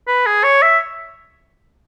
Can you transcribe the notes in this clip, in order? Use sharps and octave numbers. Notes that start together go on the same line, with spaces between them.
B4
G#4
C#5
E5